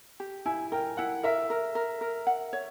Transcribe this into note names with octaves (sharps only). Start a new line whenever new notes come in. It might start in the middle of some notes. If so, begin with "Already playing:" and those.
G4
E4 G#5
A#4 G5
E4 F#5
A#4 E5
A#4
A#4
A#4
F#5
C#5